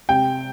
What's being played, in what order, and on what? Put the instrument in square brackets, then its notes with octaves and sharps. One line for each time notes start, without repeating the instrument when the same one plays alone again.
[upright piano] C3 G5